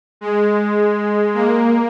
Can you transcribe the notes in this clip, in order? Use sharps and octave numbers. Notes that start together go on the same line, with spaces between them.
G#3
A#3